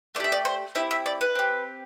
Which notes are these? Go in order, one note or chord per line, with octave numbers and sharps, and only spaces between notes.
A3 D4 D5
G4 E5
D5
C5
C4 E4 G4 E5
E5
D5
B4
C4 G4